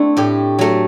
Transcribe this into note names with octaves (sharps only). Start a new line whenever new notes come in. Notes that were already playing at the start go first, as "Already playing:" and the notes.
Already playing: A3 C4 D4 E4
A2 G4
F#3 A3